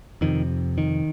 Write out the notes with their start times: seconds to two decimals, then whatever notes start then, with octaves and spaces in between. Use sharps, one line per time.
0.21 F2 C3 D#3
0.78 D#3